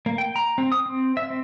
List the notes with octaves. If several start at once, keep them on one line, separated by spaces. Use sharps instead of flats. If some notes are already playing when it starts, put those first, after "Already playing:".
A#3
G5
A#5
C4
D#6
C4
E5
C4